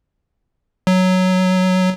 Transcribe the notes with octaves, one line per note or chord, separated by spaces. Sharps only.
F#3